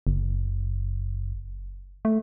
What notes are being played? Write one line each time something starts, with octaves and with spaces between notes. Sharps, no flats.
F#1
A3